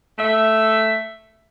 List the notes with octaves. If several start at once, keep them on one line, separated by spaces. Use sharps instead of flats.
A3 E5